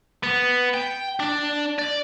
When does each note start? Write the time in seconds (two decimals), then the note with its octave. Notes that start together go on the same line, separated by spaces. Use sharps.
0.24 B3
0.74 G5
1.20 D4
1.79 D5